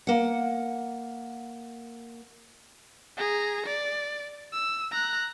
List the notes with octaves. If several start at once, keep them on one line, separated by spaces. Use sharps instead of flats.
A#3 F#5
G#4 A#5
D5
E6
A#5 F#6